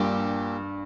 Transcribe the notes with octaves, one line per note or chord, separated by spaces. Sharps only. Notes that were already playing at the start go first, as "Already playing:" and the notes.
Already playing: G2 A#2 G3 D4 G4